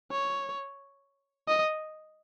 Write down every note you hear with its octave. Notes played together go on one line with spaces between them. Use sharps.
C#5
D#5